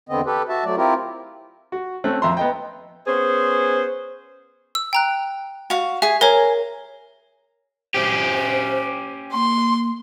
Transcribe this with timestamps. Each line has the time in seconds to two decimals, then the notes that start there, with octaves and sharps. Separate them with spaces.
0.09 E2 D3 B3 C4 D#5
0.26 G4 A4 B4
0.49 F#4 E5 A5
0.65 F#3 A3 D5
0.77 C4 E4 F4 G4 A#4
1.72 F#4
2.04 A3 C4 C#4 F#6
2.22 F2 E5 A#5 C6
2.37 B3 D#5 G5
3.07 B3 C#4 G#4 C5
4.75 E6
4.93 G5 A#5 F#6
5.70 F#4 F5
6.02 G#4 E5 G#5
6.21 G#4 A#4 C#5 A#5
7.94 C#4 G4 C5
9.34 A#3 C6